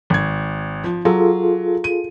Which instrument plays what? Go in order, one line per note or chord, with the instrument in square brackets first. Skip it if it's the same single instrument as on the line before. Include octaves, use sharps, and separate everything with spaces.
[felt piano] G#1 G#6
F3
[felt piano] F#3 [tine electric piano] F4 G#4 A4
[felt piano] D#7